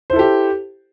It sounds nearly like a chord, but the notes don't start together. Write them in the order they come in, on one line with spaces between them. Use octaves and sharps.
C5 E4 A4 G4